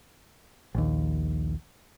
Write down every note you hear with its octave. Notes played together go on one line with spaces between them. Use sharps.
A#1 D#2